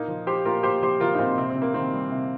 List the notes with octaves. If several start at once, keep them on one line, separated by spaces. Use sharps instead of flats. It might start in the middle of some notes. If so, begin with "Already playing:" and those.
Already playing: A#2 A#3 D#4
F3
F3 G4 C5
A#2 F4 A#4
A#2 G4 C5
F3 G4 C5
F3 F4 A#4
D#4
A#2 C4 F4
C3 C4
C4
C3
A#3
D#3 C4
G3
C3